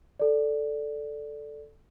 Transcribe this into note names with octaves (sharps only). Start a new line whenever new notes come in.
A4 D5